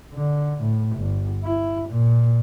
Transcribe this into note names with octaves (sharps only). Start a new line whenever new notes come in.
D3
A2
G1
E4
A#2